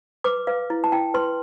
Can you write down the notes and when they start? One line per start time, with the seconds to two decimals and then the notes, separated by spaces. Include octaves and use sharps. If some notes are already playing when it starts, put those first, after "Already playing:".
0.24 B4 D6
0.47 B4 F5
0.70 E4
0.84 A5
0.92 E4 G5
1.14 B4 C6